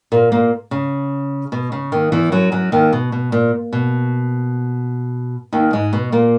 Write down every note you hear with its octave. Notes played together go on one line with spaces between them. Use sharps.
A#2 A#3
A#2 A#3
C#3
B2
C#3
D#2 D#3
E2 E3
F#2 F#3
F#2 F#3
D#2 D#3
B2
B2
A#2
B2
D#2 D#3
G#2 G#3
B2 B3
A#2 A#3